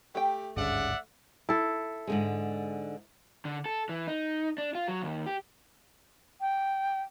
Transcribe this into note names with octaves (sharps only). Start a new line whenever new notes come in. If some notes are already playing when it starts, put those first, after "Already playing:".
A3 G4 G5
G#1 D2 G2 C#3 D5 E5 F#5
E4 A4
G#2 D3 G#3
D3
A4
E3
D#4
D4
F4
F#3
D#2
G4
G5